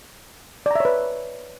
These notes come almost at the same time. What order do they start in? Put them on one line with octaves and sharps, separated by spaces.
D5 A#5 E5 C#5 B4